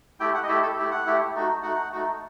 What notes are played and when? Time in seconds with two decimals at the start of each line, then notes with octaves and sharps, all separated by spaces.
0.20 A3 E4 G4 G5
0.35 F#5
0.43 D#5
0.49 A3 E4 G4 E5
0.63 A4
0.77 A3 E4 G4
0.92 F#5
1.06 A3 E4 G4
1.35 A3 D#4 F#4
1.63 A3 D#4 F#4 F#5
1.92 A3 D#4 F#4